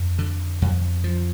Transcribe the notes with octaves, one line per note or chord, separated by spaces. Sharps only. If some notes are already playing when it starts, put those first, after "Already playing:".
Already playing: F2
D3
F2
F3